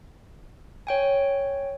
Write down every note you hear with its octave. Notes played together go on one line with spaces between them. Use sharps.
C#5 G5 G#5